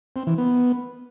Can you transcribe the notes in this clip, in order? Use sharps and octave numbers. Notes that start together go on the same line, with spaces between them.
C4
E3
B3